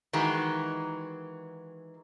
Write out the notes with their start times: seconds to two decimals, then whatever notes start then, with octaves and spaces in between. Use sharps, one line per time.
0.13 D#3 E3 G#3 F#4